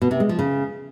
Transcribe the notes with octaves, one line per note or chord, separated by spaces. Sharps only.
B2
C3
G#3
F3
C#3